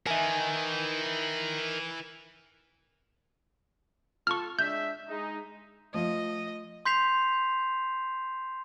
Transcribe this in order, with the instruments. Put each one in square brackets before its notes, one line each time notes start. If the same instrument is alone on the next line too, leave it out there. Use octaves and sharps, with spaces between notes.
[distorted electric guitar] E3 [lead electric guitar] A#4 D#5 [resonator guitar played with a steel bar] E5 G#5
[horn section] F4 A4 [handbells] C#6 F6
[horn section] G#3 D4 E5 [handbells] G6
[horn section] G#3 D#4
[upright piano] F3 [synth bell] A3 [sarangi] D#5
[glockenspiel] C6 G6 B6 C7 F7